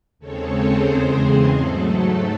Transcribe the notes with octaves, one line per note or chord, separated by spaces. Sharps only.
D#2 C#3 G#3 C4 A4 C#5
G#4 C5
E2 C#3 G#3 C4
G#2 F#3 A3 A4
A4